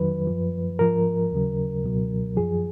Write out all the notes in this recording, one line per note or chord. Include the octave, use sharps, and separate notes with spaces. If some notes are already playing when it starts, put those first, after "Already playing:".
Already playing: F2 D#3 F#3 B4
F#2 F3
G#2 F3 A#4
D#2 C#3 F#3
C#2 B2 F#3
F#2 F3 G#4